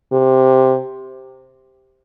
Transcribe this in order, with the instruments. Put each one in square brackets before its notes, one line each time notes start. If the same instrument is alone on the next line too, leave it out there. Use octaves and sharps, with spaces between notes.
[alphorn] C3